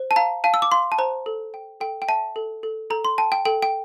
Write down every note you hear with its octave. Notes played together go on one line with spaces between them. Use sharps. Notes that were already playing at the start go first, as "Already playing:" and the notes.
Already playing: C5
A5
F5 A#5
F5 A5
E6
D6
F5 C6
A5
C5 A#5
A4
G5
A4 G5
G5
E5 A5
A4
A4
A4 A#5
C6
G5 A5
G5
A4 G5
G5